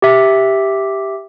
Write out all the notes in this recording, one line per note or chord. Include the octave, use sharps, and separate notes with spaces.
G4 E5